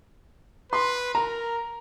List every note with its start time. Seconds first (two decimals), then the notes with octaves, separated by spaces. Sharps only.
0.72 B4 C6
1.14 A#4 A#5